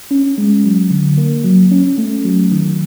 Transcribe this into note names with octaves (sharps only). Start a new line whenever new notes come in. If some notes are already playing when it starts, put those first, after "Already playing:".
C#4
G#3
F#3
D3
A#3
F#3
C#4
A3
F#3
D#3